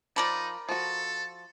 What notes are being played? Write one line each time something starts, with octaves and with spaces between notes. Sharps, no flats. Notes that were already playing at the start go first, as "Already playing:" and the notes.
F3 D#4 A#4 D5 A5 B5
F3 F#4 A4